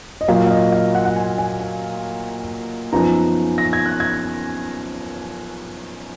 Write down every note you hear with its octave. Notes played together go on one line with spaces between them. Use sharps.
D#5
A#2 F#3 A#3 F4 F5
F5
D#5
F5
F#5
F#5
G#5
G#5
G#5
F#2 F3 B3 D#4 A#5
A#6
G#6
F#6
G#6